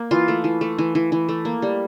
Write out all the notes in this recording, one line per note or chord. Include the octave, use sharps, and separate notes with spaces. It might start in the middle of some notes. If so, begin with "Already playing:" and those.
Already playing: A#3
E3 F4
A3
E3
A3
E3
E3
E3
A3
A#3
G3